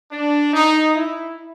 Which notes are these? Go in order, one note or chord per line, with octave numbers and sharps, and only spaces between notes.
D4
D#4
E4